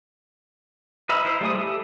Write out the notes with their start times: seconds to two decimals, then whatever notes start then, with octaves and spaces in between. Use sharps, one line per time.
1.09 B4 D#5 E5 A#5 B5
1.25 E4 C5
1.41 G3 A3 G#4 D#6
1.54 G4 A4